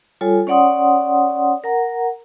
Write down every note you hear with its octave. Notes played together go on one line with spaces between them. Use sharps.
G3 F4 A4 C#5 G#5
C#4 C#5 D5 F#5 C6 D#6
A#4 F#5 A#5